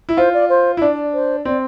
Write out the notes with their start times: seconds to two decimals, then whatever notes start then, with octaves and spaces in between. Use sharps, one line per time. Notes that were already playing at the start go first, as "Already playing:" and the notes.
0.09 E4
0.17 F4 C5
0.34 D5
0.49 C5
0.77 E4
0.81 D4 D5
1.14 C5
1.45 C4 D5